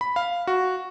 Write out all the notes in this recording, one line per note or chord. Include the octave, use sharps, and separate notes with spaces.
B5
F5
F#4